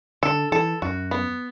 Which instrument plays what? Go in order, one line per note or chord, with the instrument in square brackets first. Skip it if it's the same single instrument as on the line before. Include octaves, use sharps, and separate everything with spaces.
[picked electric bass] D3 [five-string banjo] A4
[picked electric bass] E3 [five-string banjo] A4
[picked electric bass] F#2 [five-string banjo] F#4
[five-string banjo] B3